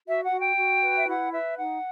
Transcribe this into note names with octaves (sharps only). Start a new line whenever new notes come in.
F#4 E5
F#5
F#4
G5
F#4
B4
E5
E4 F#5
B4 E5
D#4 F#5